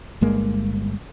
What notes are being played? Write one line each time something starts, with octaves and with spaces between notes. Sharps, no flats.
G1 G2 G#3 A#3